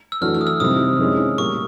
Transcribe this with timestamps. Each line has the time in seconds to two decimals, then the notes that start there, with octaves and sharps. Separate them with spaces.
0.12 E6
0.21 E3 A3 D4 F#4 F6
0.35 F6
0.41 D#6
0.47 E6
0.60 C3 D#3 G3 C4 E4 D#6
0.99 D#3 G#3 C#4 E4
1.38 A#2 G3 A#3 C#6